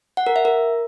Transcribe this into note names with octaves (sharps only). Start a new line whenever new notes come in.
F#5
A#4
E5
A#4